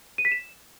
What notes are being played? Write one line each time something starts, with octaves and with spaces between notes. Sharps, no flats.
D#7
B6
E7